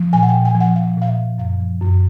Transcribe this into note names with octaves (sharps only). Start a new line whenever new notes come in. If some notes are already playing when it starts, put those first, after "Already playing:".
Already playing: F3
A#2 G#5
F#5
A#2 G5
G#5
F3
F#5
F3 F5
A#2 F5
E5
F3
F#2 F5
F3
F#2